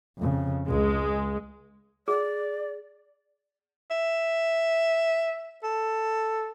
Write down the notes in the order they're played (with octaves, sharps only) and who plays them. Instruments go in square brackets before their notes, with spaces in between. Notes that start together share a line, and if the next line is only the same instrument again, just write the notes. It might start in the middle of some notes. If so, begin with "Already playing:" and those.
[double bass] F2 C#3
[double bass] C#2 [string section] G#3
[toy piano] G#4 [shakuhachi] D5
[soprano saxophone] E5
A4